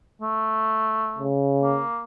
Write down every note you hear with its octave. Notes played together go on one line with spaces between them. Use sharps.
A3
C#3
A#3